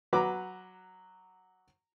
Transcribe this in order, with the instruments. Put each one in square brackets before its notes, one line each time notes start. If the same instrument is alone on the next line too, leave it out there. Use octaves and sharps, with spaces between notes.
[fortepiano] F#3 F#4 B4 A#5 D6